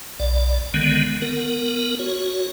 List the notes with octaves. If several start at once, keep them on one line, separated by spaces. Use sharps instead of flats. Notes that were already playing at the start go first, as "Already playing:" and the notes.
B1 D5
D3 D#3 G#3 B3
B3 A#4
F#4 C#5